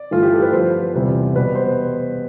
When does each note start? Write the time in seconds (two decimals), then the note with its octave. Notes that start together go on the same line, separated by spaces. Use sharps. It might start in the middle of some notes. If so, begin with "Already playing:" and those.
Already playing: D5
0.11 G2 E3 A3 F4
0.23 G4
0.33 A4
0.42 B4
0.53 G2 F3 B3 C5
0.94 E2 C3 G3 B3
1.36 B2 G3 B3 B4
1.55 C5